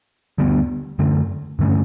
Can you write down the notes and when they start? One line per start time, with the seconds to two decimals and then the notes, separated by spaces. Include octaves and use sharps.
0.38 D2 D3 G3 B3
0.99 F#2 D3 A3
1.59 G2 D3 A3 C#4